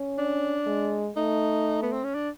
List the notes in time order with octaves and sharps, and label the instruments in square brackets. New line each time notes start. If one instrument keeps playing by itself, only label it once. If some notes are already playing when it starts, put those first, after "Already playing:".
Already playing: [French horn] C#4
[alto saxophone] D4
[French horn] G#3
[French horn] A3 [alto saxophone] D#4
[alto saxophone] B3
C4
C#4
D4